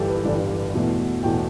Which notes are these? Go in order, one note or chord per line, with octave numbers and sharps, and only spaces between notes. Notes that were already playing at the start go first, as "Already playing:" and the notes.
Already playing: G1 G2 E3 G3 G4 A4
B4
G1 G2 E3 G3 D5
E2 B2 A3
E2 B2 A3 G5